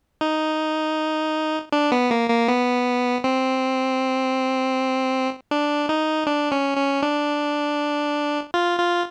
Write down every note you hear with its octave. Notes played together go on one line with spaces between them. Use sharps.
D#4
D4
B3
A#3
A#3
B3
C4
D4
D#4
D4
C#4
C#4
D4
F4
F4